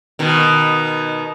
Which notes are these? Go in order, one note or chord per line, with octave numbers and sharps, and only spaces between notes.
B2 D#3